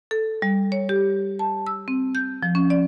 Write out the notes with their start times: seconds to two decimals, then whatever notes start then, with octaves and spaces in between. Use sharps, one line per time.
0.11 A4
0.42 G3
0.72 C#5
0.89 G4
1.39 A5
1.67 E6
1.88 C4
2.15 G6
2.43 F3
2.55 C#4
2.70 D5